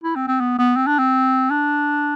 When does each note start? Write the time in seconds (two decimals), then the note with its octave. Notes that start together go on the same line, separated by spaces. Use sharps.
0.04 E4
0.16 C4
0.28 C4
0.40 B3
0.58 B3
0.76 C4
0.87 D4
0.99 C4
1.50 D4